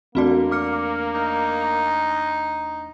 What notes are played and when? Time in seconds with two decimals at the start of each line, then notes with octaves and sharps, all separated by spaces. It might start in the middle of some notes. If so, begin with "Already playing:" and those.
0.15 E2 A3 A#3 C4 D4 F#4 D5
0.51 D6 F6 C#7
1.15 D#4